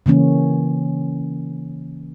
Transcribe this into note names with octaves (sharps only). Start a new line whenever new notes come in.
C#3 E3 A#3 C#4